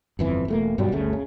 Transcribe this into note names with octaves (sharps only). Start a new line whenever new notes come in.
G1 F2 E3
E1 A3 A#3
G2 B2 F#3 G3
G1 D2 C#3 A3
C#3